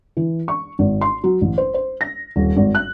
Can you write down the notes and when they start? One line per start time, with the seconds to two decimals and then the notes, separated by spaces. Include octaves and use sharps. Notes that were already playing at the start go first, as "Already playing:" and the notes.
0.17 E3
0.48 C#6
0.79 G#1
1.01 C6
1.24 F#3
1.41 A1
1.58 C5
1.74 C5
2.01 A#6
2.36 D#1
2.56 G#1
2.75 F#6